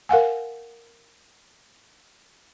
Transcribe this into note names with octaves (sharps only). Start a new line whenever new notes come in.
A#4 F5 F#5 G#5